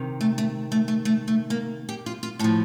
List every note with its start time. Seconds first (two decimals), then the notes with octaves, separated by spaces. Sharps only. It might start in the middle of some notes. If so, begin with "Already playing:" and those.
Already playing: C3 D#3
0.21 A3
0.38 A3
0.72 A3
0.88 A3
1.05 A3
1.28 A3
1.50 A#3
1.89 G4
2.06 F4
2.23 F4
2.39 A2 A4
2.44 F3